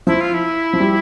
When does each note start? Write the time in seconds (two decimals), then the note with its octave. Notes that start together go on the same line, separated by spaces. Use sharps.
0.07 F3 E4
0.21 F4
0.34 E4
0.73 F3
0.80 G3